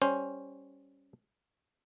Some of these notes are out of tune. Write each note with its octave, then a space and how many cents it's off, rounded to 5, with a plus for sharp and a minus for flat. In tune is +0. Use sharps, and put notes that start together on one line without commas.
G3 +0 C#4 +0 C5 +10